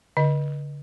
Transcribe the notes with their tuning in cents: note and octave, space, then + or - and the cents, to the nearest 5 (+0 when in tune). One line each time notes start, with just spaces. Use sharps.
D3 -30 D#5 +0